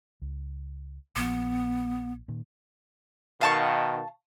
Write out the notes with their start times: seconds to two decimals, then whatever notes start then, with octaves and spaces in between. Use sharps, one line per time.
0.22 C#2
1.16 A#1 F3 B3
2.28 A#2 D#3
3.41 B2 D#3 F5 A5 C#6